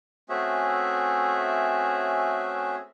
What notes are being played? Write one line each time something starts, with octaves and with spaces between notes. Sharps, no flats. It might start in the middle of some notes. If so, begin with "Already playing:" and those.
A3 C4 C#4 F#4 G#4 E5